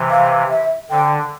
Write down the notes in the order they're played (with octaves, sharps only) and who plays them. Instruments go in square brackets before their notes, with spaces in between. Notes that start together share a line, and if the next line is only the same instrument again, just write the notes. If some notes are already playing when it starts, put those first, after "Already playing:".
Already playing: [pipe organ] C3 E3
[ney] F5
E5
[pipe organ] D3 [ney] G5